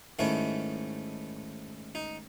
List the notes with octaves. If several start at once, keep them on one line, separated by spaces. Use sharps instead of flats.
G#2 D#3 A3 C#4 E4
D#4